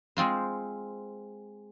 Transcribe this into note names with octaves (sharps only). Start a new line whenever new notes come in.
G#3 C4 F4 C5